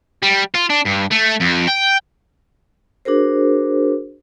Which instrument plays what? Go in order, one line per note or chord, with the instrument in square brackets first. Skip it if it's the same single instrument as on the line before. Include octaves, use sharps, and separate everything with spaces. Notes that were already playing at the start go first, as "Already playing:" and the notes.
[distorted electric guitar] G3
F4
D4
G2
A3
F2
G5
[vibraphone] D4 F#4 G#4 A#4 C5